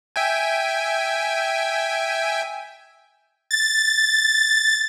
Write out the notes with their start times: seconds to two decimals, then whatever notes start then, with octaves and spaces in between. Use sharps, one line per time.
0.16 E5 G5 G#5
3.51 A6